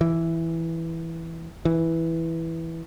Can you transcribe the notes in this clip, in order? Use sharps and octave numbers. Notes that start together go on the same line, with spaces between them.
E3
E3